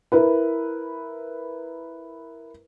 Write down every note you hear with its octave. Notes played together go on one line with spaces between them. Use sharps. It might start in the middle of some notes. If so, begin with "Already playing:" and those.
E4 A#4 B4